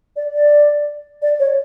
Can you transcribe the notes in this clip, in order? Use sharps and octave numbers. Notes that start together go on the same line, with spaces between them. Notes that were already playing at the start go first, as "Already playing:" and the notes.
D5
D5
D5
C#5